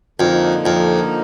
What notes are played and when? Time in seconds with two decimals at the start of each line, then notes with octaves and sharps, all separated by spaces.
0.19 F2 D3 F3 A#3 D#4
0.66 F2